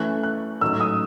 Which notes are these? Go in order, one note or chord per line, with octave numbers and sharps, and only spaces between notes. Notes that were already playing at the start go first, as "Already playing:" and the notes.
Already playing: F#2 E3 A3 C#4 F#6
F#6
A1 G#2 F#3 A3 E6
D#6